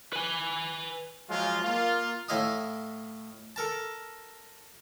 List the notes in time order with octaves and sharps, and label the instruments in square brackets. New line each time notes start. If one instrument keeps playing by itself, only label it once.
[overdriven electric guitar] B4 G#5
[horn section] F3 F#3 G#3 F4
A#3 F4
[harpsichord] A2 E4 D#5 F5 D#6
A4 A#4 A5